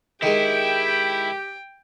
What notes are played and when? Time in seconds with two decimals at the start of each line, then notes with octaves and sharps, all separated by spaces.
0.22 D#3 G#3 E4 G4 G5